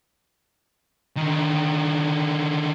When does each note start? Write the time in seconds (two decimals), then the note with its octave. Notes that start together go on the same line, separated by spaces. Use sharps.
1.17 D3 D#3